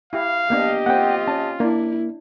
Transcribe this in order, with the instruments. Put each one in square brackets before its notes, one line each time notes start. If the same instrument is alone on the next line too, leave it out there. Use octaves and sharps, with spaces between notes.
[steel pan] E4 G4 [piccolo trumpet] F5
[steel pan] A#3 B3 D4 [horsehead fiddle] G4 D#5
[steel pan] A#3 C4 [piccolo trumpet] F4 [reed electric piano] F#5 G5
[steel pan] C#4 [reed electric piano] A5
[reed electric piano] A#3 [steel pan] D4 [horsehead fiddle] E4